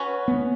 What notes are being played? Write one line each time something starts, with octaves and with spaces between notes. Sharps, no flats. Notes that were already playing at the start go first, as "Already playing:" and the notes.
Already playing: C#4 F#4 B4
B3